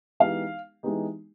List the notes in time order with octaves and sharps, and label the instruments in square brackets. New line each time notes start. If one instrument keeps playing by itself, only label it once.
[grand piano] E3 G#3 B3 D#4 G4 [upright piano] F5
[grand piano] E3 G#3 B3 D#4 G4